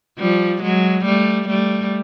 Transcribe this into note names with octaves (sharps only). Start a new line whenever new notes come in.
F3 G3
F#3 G#3
G3 A3
G3 A3